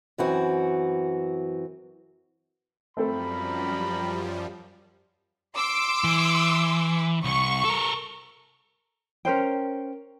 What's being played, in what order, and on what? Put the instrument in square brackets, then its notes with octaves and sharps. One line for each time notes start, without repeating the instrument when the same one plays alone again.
[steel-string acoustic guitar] F#2 E3 C4 F#4
[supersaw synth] F#2 F3 G3 [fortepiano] A3 C4 A4 [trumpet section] A#4 B5
[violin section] C6 D6 E6
[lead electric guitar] E3
[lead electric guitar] C2 [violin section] C#6
[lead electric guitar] A4 A#4
[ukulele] C#4 A#4 C5 G5